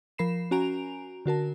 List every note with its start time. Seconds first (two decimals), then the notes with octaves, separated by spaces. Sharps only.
0.18 F3 A#4 B5 C7 E7
0.51 C#4 F#4 G#5 A#5 D7 F7
1.26 D3 F#4 A#4 A5